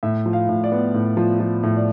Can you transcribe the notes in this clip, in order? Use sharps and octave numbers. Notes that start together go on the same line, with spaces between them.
A2 E5
F3
F5
A2
D5
B3
A2
F3
F3
A2
D5